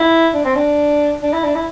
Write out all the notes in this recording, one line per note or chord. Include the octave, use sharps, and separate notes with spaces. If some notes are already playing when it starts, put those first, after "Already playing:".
Already playing: E4
D4
C4
D4
D4
E4
D4
E4